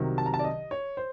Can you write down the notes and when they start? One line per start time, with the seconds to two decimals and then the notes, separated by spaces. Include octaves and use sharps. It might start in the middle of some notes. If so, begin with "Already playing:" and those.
Already playing: C2 C3 D#3 F#3
0.18 A5
0.26 A#5
0.34 A5
0.39 D5
0.44 D#5
0.71 C#5
0.97 C5